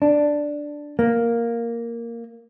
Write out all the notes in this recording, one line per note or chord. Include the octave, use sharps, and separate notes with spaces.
D4
A#3